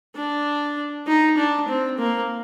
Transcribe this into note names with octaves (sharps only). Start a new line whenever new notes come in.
D4
D#4
D4
C4
A#3